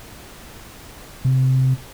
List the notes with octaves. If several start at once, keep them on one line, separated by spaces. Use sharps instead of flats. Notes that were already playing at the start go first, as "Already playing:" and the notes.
C3